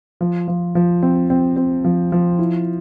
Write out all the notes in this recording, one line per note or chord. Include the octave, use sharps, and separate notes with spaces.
F3
F3
F3
C4
C4
C4
F3
F3
E4